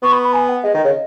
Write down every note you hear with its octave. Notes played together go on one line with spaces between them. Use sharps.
B3 C#6
B5
B5
G#5
F#5
G#3 D#5
D#3
C#3